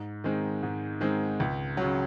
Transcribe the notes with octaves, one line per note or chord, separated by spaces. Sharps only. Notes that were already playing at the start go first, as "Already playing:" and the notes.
Already playing: G#2
D#3 G#3 C4
G#2
D#3 G#3 C4
C#2
C#3 F#3